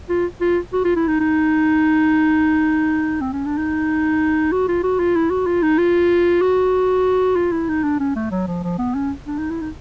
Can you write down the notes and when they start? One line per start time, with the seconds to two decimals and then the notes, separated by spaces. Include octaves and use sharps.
0.09 F4
0.41 F4
0.73 F#4
0.85 F4
0.96 E4
1.08 D#4
1.20 D#4
3.21 C4
3.33 C#4
3.46 D4
3.57 D#4
4.52 F#4
4.69 F4
4.84 F#4
5.00 F4
5.16 E4
5.31 F#4
5.47 F4
5.63 D#4
5.78 F4
6.42 F#4
7.36 F4
7.52 E4
7.69 D#4
7.84 D4
8.00 C#4
8.16 A3
8.31 F#3
8.48 F3
8.64 F3
8.79 B3
8.95 C#4
9.27 D4
9.38 D#4
9.50 E4
9.61 D#4